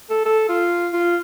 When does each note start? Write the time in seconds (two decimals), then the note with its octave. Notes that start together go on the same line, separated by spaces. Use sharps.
0.10 A4
0.26 A4
0.49 F4
0.93 F4